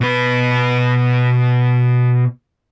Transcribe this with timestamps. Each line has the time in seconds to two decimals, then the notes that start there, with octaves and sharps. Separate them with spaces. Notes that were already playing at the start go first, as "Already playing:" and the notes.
0.01 B2 B4